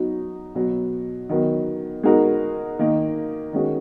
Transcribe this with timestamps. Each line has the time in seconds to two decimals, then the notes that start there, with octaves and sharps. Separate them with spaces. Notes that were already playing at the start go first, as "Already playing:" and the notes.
Already playing: F#3 B3 D#4 F#4
0.55 B2 F#3 B3
1.29 D#3 F#3 B3
2.03 G#3 B3 D#4 F#4 A#4
2.79 D#3 A#3 D#4
3.53 D#3 G#3 C#4 F#4